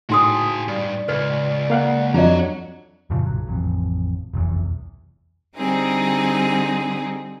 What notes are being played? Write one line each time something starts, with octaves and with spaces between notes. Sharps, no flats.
A2 D#4 F#4 G#4 C6 D#6
G2 D5
C#2 B4
A#3 F5 F#5
F2 F#3 D4 F4 C#5 D#5 F#5 A#5
F#2 A#2 C#3 F3
B1 F#3
A1 F2
F1 B1 E2
D3 G3 C4 D#4 G#4